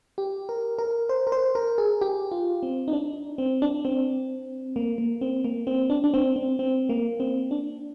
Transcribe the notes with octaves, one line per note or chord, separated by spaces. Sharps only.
G4
A#4
A#4
C5
A#4
C5
A#4
G#4
G4
F4
C4
D#4
D4
C4
D4
C4
A#3
A#3
C4
A#3
C4
D4
D4
C4
C4
C4
A#3
C4
D4